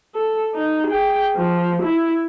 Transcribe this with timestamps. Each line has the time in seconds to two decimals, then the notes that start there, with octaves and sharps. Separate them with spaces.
0.15 A4
0.55 D#4
0.87 G#4 G5
1.36 F3
1.82 E4